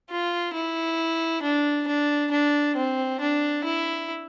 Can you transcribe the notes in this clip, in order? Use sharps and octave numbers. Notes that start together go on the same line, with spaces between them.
F4
E4
D4
D4
D4
C4
D4
E4